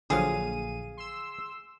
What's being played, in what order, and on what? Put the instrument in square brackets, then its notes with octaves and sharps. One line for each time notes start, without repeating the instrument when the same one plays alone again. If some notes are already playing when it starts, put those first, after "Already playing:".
[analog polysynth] A#1 D#7 [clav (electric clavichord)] D3 F3 F#3 [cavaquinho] G#4 F5
[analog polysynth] C6 E6